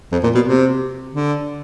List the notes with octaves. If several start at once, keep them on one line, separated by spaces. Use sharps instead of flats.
F2
A#2
B2
C3
D3